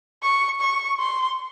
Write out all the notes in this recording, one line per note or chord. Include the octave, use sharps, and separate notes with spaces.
C#6
C#6
C6